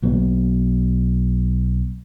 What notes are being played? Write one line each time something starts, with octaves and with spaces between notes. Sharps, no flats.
B1 F#3 A#3 B3